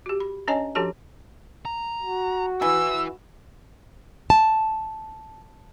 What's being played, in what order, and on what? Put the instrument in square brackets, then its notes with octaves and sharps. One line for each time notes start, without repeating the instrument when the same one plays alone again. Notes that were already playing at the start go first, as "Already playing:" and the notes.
[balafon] F#4 G4
B5
C#4 D4 C#5 D#5 G#5 A5
F3 D4 F#4 G4 A4 A5
[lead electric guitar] A#5
[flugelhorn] F#4
[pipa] E3 [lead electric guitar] E4 B4 [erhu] E6
[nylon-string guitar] A5